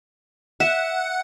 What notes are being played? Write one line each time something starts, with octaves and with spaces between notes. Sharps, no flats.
E5 F#5